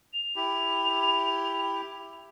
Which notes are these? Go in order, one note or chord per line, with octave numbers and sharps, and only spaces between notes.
F7
E4 G4